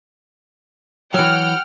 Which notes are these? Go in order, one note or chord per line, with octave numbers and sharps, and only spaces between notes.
E3 F#3 F#5 G5 F6